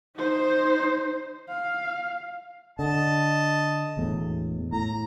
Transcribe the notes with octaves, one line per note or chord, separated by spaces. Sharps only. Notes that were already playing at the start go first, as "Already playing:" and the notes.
D#4 C5
F5
D3 D#5 A5
E1 E2 A2
A2 A#5